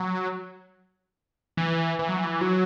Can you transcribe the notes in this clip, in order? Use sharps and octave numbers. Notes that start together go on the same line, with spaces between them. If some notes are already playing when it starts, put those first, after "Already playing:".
Already playing: F#3
E3
E3
F#3
E3
F#3